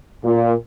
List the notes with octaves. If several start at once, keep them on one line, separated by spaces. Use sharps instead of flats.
A#2